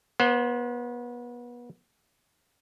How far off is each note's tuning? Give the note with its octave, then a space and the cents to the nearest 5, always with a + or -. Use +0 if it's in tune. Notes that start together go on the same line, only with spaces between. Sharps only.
B3 -30 C5 +15